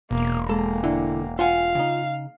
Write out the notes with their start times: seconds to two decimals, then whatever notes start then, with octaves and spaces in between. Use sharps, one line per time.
0.11 E1 B2 A#3
0.49 G#3 A#3 A4
0.84 D3 E4
1.39 F4 C5 F5 F#5 G#5
1.75 C#3 D#4